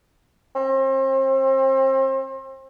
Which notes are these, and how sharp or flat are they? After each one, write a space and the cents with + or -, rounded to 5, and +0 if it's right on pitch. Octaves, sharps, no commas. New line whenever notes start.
C4 +35